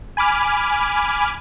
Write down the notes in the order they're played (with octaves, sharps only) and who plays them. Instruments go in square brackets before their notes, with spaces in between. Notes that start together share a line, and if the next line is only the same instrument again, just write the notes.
[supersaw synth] G#5 B5 D6 F6